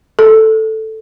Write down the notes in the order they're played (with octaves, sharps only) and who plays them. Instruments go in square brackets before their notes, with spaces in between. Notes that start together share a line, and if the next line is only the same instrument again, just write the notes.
[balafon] A4